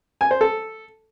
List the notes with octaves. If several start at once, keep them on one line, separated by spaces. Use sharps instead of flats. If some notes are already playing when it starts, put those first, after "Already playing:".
G#5
C5
A4